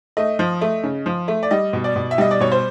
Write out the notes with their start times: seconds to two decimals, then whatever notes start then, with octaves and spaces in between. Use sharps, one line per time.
0.17 A3 D#5
0.39 F3
0.61 A3
0.84 C#3
1.06 F3
1.28 A3
1.43 D5
1.51 G3 D#5
1.73 B2
1.84 D5
1.96 B2
2.11 E5
2.18 G3 D#5
2.31 D5
2.40 B2 C#5
2.52 C5